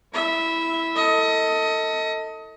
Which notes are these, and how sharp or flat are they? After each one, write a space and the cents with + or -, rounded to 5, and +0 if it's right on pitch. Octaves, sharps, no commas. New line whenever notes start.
E4 +0 E5 -15
A4 +25 D#5 +25